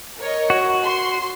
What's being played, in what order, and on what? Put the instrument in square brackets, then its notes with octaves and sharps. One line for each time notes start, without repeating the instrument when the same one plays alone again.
[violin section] A#4 C#5 D#5
[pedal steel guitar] F#4
[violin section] C6